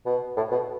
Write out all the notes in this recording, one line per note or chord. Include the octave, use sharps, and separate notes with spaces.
B2
A2
B2